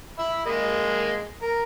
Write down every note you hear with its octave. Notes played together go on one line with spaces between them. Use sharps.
E5 B5
G#3 A#3 D#5
A#4